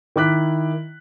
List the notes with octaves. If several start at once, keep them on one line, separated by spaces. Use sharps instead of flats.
D#3 E4 D6 F#6 B6